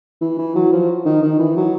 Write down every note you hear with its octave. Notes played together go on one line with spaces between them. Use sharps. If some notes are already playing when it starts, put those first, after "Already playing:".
E3
E3
F#3
F3
D#3
D#3
E3
F#3